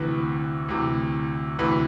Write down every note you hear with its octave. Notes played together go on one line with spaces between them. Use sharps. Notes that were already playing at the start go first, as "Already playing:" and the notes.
Already playing: D2 C3 E3 B4
D2 C3 E3
D2 C3 E3 B4